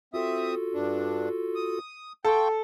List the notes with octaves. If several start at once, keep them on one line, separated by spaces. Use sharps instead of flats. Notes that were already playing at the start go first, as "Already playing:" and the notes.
C4 F4 F#4 A4 E5 D#6
G2 D4
D#6
A4 F5 G5 C6 C#6